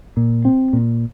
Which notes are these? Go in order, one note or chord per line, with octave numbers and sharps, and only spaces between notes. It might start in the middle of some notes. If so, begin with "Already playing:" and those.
A#2
C4
A#2